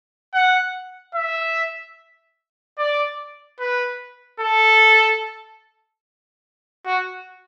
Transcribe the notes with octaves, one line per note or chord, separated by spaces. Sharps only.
F#5
E5
D5
B4
A4
F#4